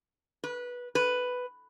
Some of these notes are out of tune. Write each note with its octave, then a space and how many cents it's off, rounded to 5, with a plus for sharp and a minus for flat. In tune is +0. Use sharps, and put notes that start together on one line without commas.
B4 -15
B4 +5